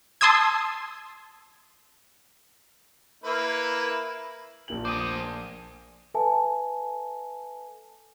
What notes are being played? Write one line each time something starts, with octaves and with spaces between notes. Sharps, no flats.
A5 C6 D#6 E6 G#6
A#3 E4 B4
A#1 A#3 F#7
C5 G#5 D6 D#6
A4 B4 E5 G#5 A5